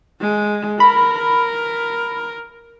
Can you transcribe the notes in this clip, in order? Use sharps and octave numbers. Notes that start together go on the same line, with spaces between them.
G#3
A#4 B5